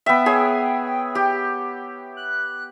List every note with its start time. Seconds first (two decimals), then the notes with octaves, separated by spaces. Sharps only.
0.06 B3 E5 G5
0.26 G#4 C#5
1.15 G4
2.17 F#6